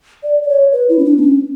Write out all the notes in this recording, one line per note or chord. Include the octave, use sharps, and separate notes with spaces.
D5
D5
C#5
B4
E4
C#4
D4
B3
C#4